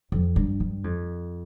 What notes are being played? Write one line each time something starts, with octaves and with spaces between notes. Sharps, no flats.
F2
G2
G2
F2